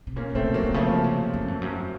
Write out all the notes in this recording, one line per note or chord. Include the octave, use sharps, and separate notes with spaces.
C3
A#2 A#3 C#4
C3 A3 C4
F#3 A#3
C3
C#3 F3 A3
C3
F#2
F2
F#2